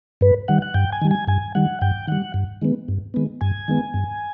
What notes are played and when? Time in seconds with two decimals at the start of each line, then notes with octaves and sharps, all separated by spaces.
0.21 G2 B4
0.48 D#3 G3 F#5
0.62 F#5
0.74 G2 G5
0.92 G#5
1.02 D#3 G3
1.11 G#5
1.28 G2 G#5
1.55 D#3 G3 F#5
1.81 G2 G5
2.07 D#3 G3 F#5
2.34 G2
2.62 D#3 G#3 B3
2.88 G2
3.14 D#3 G#3 B3
3.41 G2 G#5
3.68 D#3 G#3 B3
3.94 G2